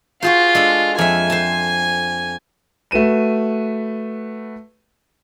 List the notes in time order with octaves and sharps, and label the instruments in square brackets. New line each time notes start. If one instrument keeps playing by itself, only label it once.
[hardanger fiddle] F4 [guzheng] F#4 G#4 C5
[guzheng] G#3 D4 A4
[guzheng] F2 E5 [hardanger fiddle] G#5
[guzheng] C5 A5
[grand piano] A3 F#4 B4 D#7 E7